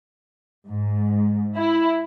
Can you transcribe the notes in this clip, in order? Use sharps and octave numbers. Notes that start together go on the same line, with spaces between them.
G#2
E4